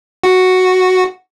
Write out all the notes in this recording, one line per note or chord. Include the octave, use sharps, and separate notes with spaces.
F#4